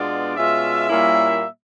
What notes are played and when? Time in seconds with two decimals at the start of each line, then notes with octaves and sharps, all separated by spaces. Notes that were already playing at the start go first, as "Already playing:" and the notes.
Already playing: B2 G#3 B3 D4 F4 D5
0.37 B2 G#3 C#4 F4 E5
0.90 A#2 G3 A#3 C#4 E4